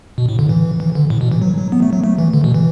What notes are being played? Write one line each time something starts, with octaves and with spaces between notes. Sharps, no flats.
B2
A2
D3
E3
E3
D3
A2
B2
E3
F#3
F#3
B3
A3
F#3
A3
E3
D3
B2
E3